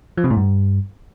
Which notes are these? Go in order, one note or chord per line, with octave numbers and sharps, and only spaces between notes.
F3
C3
A2
G2